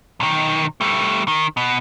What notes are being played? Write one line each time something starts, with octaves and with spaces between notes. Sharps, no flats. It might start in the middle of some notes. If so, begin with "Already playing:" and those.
B1 D#3
G3 A3
D#3
B2